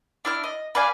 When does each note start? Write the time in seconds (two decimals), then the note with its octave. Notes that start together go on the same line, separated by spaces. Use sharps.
0.25 D4 E4 F6
0.44 D#5
0.75 B4 D5 F5 G#5